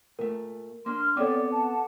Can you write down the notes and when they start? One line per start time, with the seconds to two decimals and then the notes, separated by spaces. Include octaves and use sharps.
0.19 A#2 A3 A#4
0.86 A#3 D4 C6 F6
1.17 B3 C4 A4 C#5 D5 G#5 D6
1.51 F#5 A5